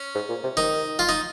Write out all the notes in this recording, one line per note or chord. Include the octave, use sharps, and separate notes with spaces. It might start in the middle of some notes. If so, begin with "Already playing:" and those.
Already playing: C#4
G#2
A#2
C3
D#3 D#4
F4
D#4